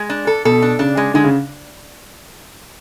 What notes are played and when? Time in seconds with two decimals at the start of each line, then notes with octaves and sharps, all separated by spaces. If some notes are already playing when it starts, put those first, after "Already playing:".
Already playing: G#3
0.10 D4
0.27 A4
0.45 B2 A4
0.62 D4
0.79 C#3 D4
0.97 G#3
1.14 D3 G#3
1.24 C#3